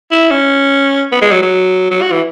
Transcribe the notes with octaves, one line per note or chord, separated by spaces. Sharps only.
E4
C#4
B3
G#3
F#3
F#3
F#3
F#4
E3